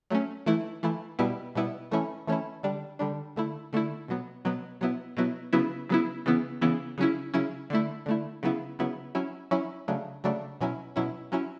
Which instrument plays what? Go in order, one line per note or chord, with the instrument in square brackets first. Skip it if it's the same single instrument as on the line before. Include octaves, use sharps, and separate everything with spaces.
[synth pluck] F#3 A3 C#4
E3 A3 E4
E3 A3 E4
B2 G3 B3 E4
B2 G3 B3 E4
E3 A3 C#4 E4
E3 A3 C#4 E4
D3 G3 D4
D3 G3 D4
D3 A3 E4
D3 A3 E4
B2 F#3 B3
B2 F#3 B3
B2 F#3 B3 E4
B2 F#3 B3 E4
C#3 F#3 B3 E4
C#3 F#3 B3 E4
C#3 E3 B3 E4
C#3 E3 B3 E4
C#3 F#3 C#4 E4
C#3 F#3 C#4 E4
D3 A3 E4
D3 A3 E4
C#3 F#3 B3 E4
C#3 F#3 B3 E4
F#3 C#4 E4
F#3 C#4 E4
C#3 F#3 A3 D4
C#3 F#3 A3 D4
B2 F#3 C#4 E4
B2 F#3 C#4 E4
F#3 C#4 E4